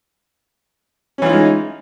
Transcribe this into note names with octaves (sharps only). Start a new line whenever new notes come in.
E3 G#3 C#4 D#4 F4